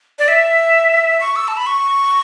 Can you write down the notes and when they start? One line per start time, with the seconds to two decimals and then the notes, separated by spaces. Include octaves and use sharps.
0.19 D5
0.28 E5
1.20 C#6
1.36 E6
1.48 A5
1.57 B5
1.66 C#6